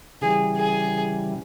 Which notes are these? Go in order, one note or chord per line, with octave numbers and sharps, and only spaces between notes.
C#3 E3 G3 G#4
G#4